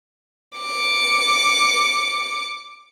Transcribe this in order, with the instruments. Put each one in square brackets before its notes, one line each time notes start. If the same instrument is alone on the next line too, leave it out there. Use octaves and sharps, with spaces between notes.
[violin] D6 C#7